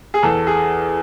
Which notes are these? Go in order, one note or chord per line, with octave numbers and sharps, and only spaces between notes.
G#4
E2 A4
G#4